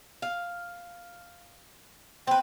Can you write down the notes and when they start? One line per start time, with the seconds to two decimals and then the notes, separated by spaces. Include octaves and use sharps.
0.22 F5
2.27 C4 B4 G5